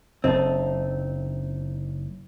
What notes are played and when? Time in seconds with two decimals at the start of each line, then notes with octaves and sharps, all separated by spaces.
0.24 F#1 C4 D#4 A4